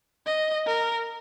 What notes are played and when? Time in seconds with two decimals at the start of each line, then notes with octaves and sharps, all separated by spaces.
0.26 D#5
0.66 A#4